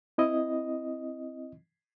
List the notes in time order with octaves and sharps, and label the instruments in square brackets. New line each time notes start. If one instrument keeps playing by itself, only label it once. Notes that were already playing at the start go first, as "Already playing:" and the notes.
[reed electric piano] C4 E4 D#5